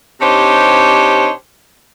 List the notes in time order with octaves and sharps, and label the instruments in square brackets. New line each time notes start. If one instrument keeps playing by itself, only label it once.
[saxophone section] C3 D4 D#4 G4 C5 C#5